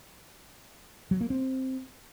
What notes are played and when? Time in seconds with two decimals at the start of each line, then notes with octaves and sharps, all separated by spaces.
1.11 F#3
1.21 A#3
1.30 C4